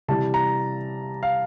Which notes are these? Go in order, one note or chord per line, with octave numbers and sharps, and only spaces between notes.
C3 E3 G3 A5
A#5
F5